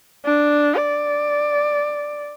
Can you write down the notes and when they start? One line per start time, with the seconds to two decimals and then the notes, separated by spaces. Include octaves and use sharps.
0.26 D4
0.76 D5